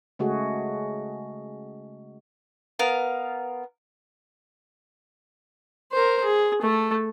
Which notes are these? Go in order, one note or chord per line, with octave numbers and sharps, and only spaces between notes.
C#3 G#3 A3 F#4 G#4
B3 A#4 F5
A#4 C5
G#4
A3 A4